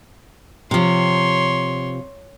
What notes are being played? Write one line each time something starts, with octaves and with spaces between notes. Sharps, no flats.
C3 F3 C#5 C6